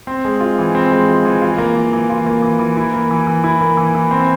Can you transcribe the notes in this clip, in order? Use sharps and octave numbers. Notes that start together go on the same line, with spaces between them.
C4
G#3
F4
E3
C4
G#3
F4
E3
F4
A#3
E3
E3
F4
A#3
E3
E3
E4
A#3
E3
E3
E4
A#3
E3
E3
C4